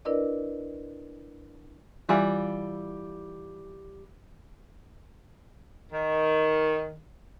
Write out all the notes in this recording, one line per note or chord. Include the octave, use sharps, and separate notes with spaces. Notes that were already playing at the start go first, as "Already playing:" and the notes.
D4 E4 A#4 B4 D5 D#5
E3 G3 F4
D#3